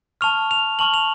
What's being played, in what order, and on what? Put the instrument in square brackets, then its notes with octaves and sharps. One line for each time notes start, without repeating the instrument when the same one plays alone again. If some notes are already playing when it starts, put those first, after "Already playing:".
[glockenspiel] A5 C#6 F6 F7
F7
A5 C#6 F6 F#7
F7